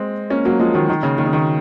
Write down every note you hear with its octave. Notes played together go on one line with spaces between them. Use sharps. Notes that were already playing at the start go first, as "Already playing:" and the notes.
Already playing: G#3 C4
A#3 C#4
F#3 A#3
F3 G#3
D#3 F#3
D#3
C#3
D#3
C#3
D#3